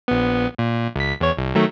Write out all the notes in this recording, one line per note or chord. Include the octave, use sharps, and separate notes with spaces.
A#1 B3
A#2
C#2 B6
E2 C#5
C2
D#3 F#3 A3